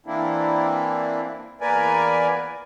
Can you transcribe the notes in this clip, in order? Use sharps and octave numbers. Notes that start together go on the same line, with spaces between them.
E3 A#3 C4 D4 E4
E2 A#3 A#4 B4 D5 G#5